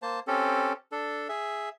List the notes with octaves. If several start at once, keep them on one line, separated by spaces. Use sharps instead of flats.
A#3 C5 A5
C4 C#4 G4 A4
D4 A4
G#4 E5